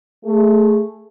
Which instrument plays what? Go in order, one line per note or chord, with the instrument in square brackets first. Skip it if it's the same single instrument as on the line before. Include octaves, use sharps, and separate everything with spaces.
[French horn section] A3 G#4